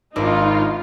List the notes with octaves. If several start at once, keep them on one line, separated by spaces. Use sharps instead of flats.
G#1 D4 D#4 F4